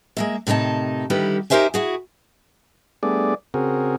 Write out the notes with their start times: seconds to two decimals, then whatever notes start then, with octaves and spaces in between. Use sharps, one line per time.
0.17 G#3 A#3 E5
0.47 A2 C3 D#3 D#4 A5
1.10 D3 D#3 G3 E4 G4 B4
1.50 D#4 G4 A#4 C5 E5 G#5
1.74 E4 F#4 G#4
3.03 G3 A3 B3 D4 G#4 D5
3.54 C#3 C4 F#4 G#4 A#4